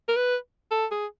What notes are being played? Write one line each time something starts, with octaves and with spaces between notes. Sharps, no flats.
A#4
B4
A4
G#4